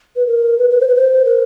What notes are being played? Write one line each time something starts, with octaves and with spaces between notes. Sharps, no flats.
B4
A#4
B4
B4
C5
B4
C5
A#4